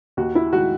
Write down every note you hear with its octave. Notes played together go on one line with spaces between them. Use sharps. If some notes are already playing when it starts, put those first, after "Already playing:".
D#2 F#4
E4
D#3 G#3 F#4